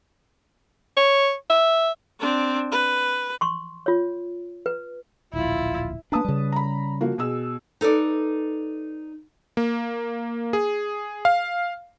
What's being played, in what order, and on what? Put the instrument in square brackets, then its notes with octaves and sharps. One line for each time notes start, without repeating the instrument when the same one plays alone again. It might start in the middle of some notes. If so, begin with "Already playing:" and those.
[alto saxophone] C#5
E5
[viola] C4 D4
B4
[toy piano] C6 C#6
F4 C#5
B4
[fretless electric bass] D1 A#1 [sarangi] E4 [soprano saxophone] F4
[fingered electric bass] A#3 D4 [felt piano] B4 A5 D#6
[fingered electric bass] C#3 G3
[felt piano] A#5 B5
F3 A#3 F#4
B2 G#4 E6
[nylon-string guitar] D#4 A4 B4 D5
[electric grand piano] A#3
G#4
F5